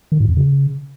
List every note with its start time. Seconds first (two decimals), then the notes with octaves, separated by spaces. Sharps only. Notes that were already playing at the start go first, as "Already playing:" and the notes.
0.12 D#3
0.20 G#2
0.29 F2
0.37 C#3